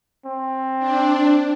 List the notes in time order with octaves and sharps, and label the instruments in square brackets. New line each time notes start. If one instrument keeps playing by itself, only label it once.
[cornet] C4
[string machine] D4